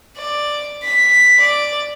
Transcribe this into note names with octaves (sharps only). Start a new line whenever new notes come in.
D5
B6
D5